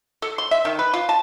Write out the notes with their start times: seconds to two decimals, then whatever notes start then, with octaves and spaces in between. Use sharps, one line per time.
0.22 A4
0.38 C6
0.51 E5
0.65 D#3
0.79 B4
0.94 F4
1.09 A5